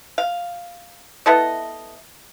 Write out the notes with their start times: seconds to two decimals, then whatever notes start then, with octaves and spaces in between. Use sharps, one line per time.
0.18 F5
1.26 B3 E4 A4 D#5